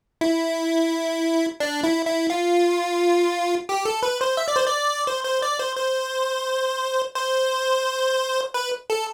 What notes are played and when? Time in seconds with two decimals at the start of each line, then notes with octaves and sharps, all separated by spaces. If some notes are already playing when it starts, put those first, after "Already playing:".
0.21 E4
1.60 D4
1.83 E4
2.06 E4
2.30 F4
3.69 G4
3.85 A4
4.03 B4
4.21 C5
4.37 E5
4.48 D5
4.56 C5
4.66 D5
5.07 C5
5.25 C5
5.42 D5
5.59 C5
5.76 C5
7.15 C5
8.54 B4
8.90 A4